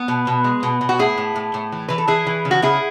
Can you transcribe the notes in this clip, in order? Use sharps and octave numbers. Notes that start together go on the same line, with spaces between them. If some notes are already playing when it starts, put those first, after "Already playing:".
Already playing: B3
B2
B2
G#3
B2
B2
F#4
A2 E4 G#4
A2
A2
A2
E3
E3 B4
A4
E3 E4 G#4
E3
C#3
F#4
C#3 E4 G#4